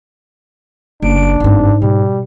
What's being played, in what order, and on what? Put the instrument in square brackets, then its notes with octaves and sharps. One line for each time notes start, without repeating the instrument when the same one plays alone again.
[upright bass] F#1 [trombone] D4 [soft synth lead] D7
[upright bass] G1 C4 [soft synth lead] G#2
[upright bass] B2 [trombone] G3